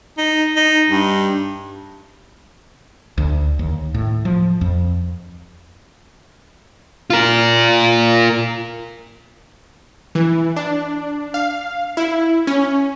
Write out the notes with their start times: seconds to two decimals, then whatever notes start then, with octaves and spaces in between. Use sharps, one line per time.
0.18 D#4
0.56 D#4
0.90 G2
3.18 D2
3.59 D#2
3.94 A2
4.25 F3
4.61 F2
7.10 F4 A#4
10.15 E3
10.56 D4
11.34 F5
11.97 E4
12.47 C#4